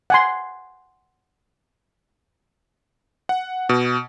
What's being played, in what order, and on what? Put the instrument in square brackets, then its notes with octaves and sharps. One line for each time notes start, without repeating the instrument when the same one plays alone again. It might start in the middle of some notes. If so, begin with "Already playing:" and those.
[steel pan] F#5 G#5 C6
[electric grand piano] F#5
B2